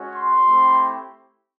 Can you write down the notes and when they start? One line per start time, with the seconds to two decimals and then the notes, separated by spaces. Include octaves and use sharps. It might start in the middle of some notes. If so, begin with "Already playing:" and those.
Already playing: G#3 C#4 F#4
0.14 C6
0.45 A3 C4 E4 G4